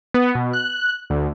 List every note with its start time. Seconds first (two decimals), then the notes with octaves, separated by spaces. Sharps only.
0.14 B3
0.35 B2
0.53 F#6
1.10 D2